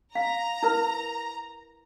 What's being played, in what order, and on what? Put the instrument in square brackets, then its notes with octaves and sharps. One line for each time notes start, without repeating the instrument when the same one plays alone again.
[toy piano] F5 [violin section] A#5
[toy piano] E4 A#4 B4